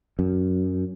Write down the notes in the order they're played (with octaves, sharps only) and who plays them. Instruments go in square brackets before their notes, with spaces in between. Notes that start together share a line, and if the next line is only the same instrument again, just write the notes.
[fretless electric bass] F#2